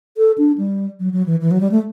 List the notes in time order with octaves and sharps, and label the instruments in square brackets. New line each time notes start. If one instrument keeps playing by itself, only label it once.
[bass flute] A4
D4
G3
F#3
F#3
E3
E3
F#3
G3
A3